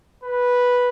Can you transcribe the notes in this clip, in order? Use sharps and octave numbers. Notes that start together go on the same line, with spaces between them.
B4